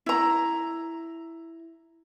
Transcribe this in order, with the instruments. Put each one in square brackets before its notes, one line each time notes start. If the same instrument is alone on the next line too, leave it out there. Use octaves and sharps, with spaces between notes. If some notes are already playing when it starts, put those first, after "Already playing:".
[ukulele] E4 A#5